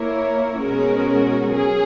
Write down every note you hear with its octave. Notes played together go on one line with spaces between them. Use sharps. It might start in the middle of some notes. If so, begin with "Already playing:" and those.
Already playing: A#3 E4 A#4 C#5
B2 G#3 C#4 F#4 A#4
F#3 C#4 G#4